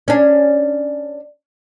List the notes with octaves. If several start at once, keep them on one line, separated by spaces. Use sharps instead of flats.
C#4 D4